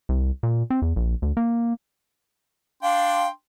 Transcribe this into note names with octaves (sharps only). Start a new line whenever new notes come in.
C2
A#2
C4
E2
A#1
D2
A#3
D4 F5 G5 C6